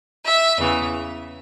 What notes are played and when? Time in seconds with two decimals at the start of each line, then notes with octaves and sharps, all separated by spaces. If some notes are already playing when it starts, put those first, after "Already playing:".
0.25 E5
0.58 E2 C#3 E3